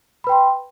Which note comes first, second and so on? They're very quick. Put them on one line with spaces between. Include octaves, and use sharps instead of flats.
B5 B4 G5 C6